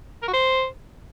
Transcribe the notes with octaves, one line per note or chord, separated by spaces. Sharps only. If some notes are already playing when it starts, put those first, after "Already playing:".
A#4
F#4
C5